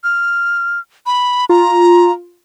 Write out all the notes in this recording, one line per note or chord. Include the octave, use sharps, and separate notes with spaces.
F6
B5
F4 A#5